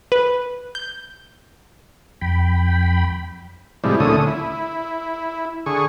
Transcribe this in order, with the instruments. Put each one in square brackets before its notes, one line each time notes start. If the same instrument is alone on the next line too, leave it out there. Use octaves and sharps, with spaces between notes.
[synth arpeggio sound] B4
G6
[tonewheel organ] F2 G5 B5
[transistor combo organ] A2 C3 F3 G3 G#3 E4
D2 A#2 D3 A3 C#4 D#6
E4
D3 G#4 C#6